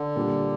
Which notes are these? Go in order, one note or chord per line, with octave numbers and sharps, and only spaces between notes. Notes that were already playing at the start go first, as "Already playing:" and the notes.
Already playing: D3
A#2 G3 A#3 D4